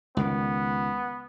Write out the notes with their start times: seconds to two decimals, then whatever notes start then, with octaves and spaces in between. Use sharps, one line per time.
0.17 C#2 D#3 B3